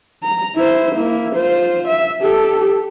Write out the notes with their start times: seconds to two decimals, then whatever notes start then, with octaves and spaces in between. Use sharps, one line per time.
0.23 A#5
0.56 E4 C5
0.95 A#3 E4
1.36 F4 C5
1.88 E5
2.22 G4 A4